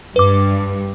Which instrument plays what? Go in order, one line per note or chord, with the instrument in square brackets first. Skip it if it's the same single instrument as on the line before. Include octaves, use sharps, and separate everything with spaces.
[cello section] G2 [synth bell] B4 D6